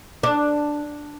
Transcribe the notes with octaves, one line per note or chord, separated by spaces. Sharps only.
D4